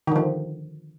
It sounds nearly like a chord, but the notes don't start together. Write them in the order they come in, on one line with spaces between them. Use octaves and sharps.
D#3 D3 F3